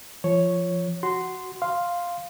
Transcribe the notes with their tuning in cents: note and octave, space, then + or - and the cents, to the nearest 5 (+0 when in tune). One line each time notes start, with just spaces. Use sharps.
F3 -10 C#5 +0
F#4 +5 C6 -10
F5 +0 C6 +0